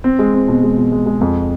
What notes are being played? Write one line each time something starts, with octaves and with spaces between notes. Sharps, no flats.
C4
G#3
C4
B2
G#3
B2
G#3
G#3
F2